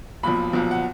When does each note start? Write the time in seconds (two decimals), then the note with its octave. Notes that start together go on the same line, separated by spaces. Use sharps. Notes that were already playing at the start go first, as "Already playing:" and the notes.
0.23 B1 A#2 F3 B5
0.53 B1 A#2 F3
0.71 F#5